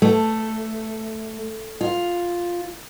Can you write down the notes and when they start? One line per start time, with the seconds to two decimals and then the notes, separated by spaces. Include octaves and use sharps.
0.02 A3
1.81 F4